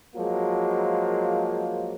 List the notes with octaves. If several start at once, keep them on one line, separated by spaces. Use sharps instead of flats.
F3 F#3 G#3 A#3